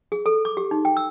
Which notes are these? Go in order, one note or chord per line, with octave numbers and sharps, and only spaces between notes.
G#4
A4
D6
G4
D#4
G5
E6